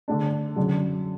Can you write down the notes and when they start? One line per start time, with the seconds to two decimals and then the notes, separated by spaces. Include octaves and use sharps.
0.08 D3 A3 D4
0.56 F#2 D3 F#3